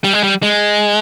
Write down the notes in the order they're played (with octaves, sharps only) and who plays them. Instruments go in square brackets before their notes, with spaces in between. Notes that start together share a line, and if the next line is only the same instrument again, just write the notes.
[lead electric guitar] G3
G#3
G3
G#3